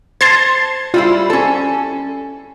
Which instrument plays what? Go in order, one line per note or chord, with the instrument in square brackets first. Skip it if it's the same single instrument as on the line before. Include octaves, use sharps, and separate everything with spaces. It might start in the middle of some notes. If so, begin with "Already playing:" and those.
[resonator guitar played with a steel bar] C5 [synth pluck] A5 C6 G#6
[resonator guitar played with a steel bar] G3 E4 C5 [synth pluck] F4
[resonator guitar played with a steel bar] C#4 A4